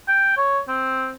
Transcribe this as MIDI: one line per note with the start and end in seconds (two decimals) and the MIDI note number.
0.08 0.32 79
0.37 0.59 73
0.68 1.12 60